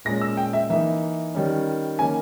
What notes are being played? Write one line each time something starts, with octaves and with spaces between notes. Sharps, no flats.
A#2 G#3 C#4 A#6
E6
G5
E5
E3 A#3 D#4 E5
D#3 G3 C#4
D#3 A#3 C#4 G#5